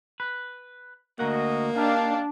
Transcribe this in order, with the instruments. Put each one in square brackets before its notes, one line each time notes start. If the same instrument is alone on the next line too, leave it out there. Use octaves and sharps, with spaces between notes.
[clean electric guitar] B4
[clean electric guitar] D2 A#4 F#5 [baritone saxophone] A#3 [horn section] F#4 D#5
[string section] D4 [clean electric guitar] D#4 G4 [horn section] F5